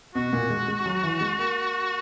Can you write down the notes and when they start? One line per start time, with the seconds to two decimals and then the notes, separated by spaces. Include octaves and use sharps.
0.15 B2 F#4
0.33 A#2
0.50 G#3
0.68 G#3
0.86 F#3
1.03 E3
1.21 G#3
1.39 A#3